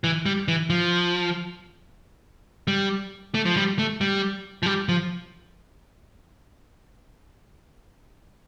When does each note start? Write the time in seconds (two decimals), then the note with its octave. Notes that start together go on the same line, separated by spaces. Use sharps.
0.04 E3
0.26 G3
0.48 E3
0.70 F3
2.67 G3
3.34 A3
3.45 F3
3.57 G3
3.79 A3
4.01 G3
4.63 F3
4.66 G3
4.89 F3